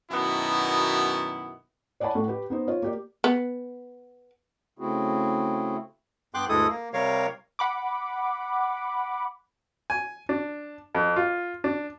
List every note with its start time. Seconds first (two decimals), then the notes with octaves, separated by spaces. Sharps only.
0.11 F#2 B2 D#3 B3 E4
2.00 C#5 D5 F#5 G#5 A5 B5
2.15 A2 F#5
2.28 G4 B4
2.50 B3 D#4 C5
2.67 F4 C#5
2.82 A#3 G4 D5
3.24 B3
4.79 C#3 A3 C4 E4 F#4 G#4
6.34 G2 B3 G5 C6 D6 F#6
6.49 D2 G2 G#3 E4 A4 D#6
6.69 A#3
6.93 C3 G3 A#4 C#5 F5
7.59 F#5 B5 D6
9.90 G#5
10.29 D4
10.95 F2
11.16 F4
11.64 D4